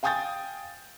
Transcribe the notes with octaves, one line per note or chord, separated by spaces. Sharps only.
F5 G5 G#5 D#6 G6 A6